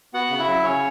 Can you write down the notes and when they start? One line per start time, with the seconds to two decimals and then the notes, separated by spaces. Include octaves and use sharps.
0.14 B3 F#4 F#5
0.31 C#3
0.39 E4 E5
0.48 F#3
0.64 C#3 C#4 C#5